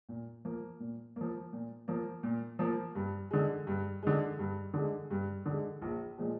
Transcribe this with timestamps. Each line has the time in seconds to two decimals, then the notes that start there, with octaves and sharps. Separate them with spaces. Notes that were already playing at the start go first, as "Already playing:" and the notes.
0.09 A#2
0.45 F3 A#3
0.80 A#2
1.16 F3 A#3
1.53 A#2
1.88 F3 A#3
2.23 A#2
2.59 F3 A#3
2.95 G2
3.31 D3 G#3
3.67 G2
4.02 D3 G#3
4.39 G2
4.74 D3 G#3
5.11 G2
5.46 D3
5.51 G#3
5.82 A#1
6.18 A#2 F3 G#3